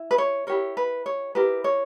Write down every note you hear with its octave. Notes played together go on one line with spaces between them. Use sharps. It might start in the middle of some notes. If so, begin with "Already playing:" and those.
Already playing: E4
B4
C#5
E4 G4 A#4 C#5
B4
C#5
E4 G4 A#4 B4
C#5